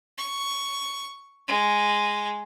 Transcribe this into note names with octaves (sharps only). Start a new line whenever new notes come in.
C#6
G#3